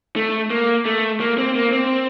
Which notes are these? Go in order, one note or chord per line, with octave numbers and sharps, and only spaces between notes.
A3
A#3
A3
A#3
C4
A#3
C4